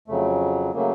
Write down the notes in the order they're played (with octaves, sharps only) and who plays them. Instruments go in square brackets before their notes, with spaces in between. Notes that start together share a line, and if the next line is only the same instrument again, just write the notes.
[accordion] F2 C#3 F#3 A3
C#3 F#3 A3 A#3